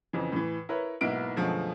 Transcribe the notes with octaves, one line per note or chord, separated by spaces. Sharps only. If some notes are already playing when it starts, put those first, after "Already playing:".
F2 C#3 E3
A2 E3
E4 A#4 B4 C#5
B1 G#2 A#3 B3 E4 D7
F#2 B2 D3 F3 G#3 A3